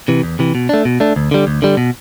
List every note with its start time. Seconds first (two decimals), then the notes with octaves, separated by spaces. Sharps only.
0.08 C3 E3
0.23 E2
0.39 C3 E3
0.55 B2
0.69 A3 D4
0.85 B2
1.00 A3 D4
1.16 D2
1.31 D3 G3
1.47 D2
1.62 D3 G3
1.77 B2